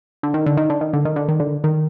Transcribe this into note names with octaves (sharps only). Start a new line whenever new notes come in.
D3
D#3
D3
D#3
D3
D#3
D3
D#3
D3
D#3
D3
D#3